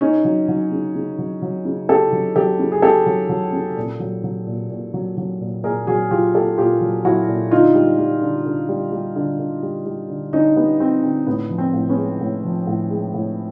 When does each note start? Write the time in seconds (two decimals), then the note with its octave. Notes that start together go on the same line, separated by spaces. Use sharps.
0.01 C#3 C#4 D#4
0.25 F#3
0.48 F#3
0.72 C#3
0.95 C#3
1.19 F#3
1.42 F#3
1.65 C#3
1.89 C#3 G4 A4
2.12 F#3
2.36 F#3 G4 A4
2.60 C#3
2.72 G#4
2.82 C#3 G4 A4
3.06 F#3
3.29 F#3
3.53 C#3
3.77 A#2
4.00 F#3
4.24 F#3
4.46 A#2
4.70 A#2
4.94 F#3
5.17 F#3
5.40 A#2
5.64 A#2 G#4 A#4
5.87 F#3 F#4 G#4
6.10 F#3 F4 G4
6.34 A#2 G4 A4
6.58 A#2 F4 G4
6.81 F#3
7.04 F#3 E4 F#4
7.28 A#2
7.51 D3 D#4 F4
7.75 G3
7.99 G3
8.22 D3
8.46 D3
8.69 G3
8.92 G3
9.16 D3
9.39 D3
9.63 G3
9.86 G3
10.09 D3
10.33 D3 C#4 D#4
10.56 G3 B3
10.80 G3 C4
11.03 D3 C4
11.27 A2 B3
11.50 F3
11.58 C4
11.74 A2
11.89 B3 C#4
11.97 G#3
12.21 A2
12.44 F3
12.67 A2
12.90 G#3
13.14 A2